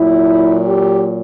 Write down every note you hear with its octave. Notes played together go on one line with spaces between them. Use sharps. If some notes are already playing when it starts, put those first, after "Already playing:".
Already playing: A#2 F#3 E4
G4